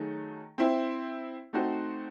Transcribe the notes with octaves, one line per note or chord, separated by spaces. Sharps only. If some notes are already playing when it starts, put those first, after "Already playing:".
Already playing: D#3 F#3 A3 D#4 G#4
C4 E4 C5
A3 C4 D#4 F#4 C5